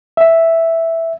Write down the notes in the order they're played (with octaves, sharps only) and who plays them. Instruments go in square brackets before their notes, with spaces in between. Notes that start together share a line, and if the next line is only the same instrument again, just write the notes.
[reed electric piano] E5